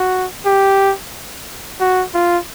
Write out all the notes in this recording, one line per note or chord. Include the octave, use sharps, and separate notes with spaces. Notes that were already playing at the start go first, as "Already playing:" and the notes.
Already playing: F#4
G4
F#4
F4